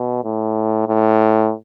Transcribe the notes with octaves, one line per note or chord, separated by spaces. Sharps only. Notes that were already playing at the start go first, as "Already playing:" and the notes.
Already playing: B2
A2
A2